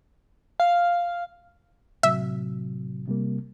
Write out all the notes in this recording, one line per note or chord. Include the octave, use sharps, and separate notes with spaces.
F5
A2 C3 F#3 E5
C3 G3 A#3